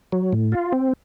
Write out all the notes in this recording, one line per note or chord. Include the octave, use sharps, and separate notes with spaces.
F#3
A2
F4
C4